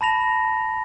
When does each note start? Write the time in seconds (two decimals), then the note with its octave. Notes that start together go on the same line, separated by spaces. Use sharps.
0.01 A5 B5 A#6 F7